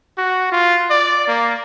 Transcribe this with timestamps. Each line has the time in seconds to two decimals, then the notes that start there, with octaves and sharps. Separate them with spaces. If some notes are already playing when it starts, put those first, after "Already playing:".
0.17 F#4
0.52 F4
0.90 D5
1.27 A#3